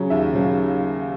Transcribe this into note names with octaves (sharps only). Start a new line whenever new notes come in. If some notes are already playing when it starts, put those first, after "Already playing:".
Already playing: C#3 F#3
D#2 E5
C#3 F#3